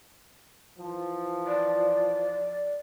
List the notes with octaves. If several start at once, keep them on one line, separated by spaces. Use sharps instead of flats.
E3 F3
D5